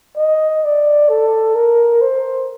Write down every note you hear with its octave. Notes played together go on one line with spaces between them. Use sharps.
D#5
D5
A4
A#4
C5